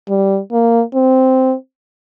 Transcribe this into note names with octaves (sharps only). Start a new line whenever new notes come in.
G3
A#3
C4